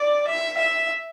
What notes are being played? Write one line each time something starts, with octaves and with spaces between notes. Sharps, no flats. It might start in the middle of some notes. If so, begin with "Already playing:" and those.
Already playing: D5
E5
E5